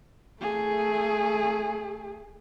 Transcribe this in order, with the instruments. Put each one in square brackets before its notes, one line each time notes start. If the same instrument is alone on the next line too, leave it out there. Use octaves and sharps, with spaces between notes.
[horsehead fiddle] A3 G#4